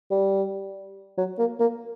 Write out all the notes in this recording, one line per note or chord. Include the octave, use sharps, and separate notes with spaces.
G3
F#3
A#3
A#3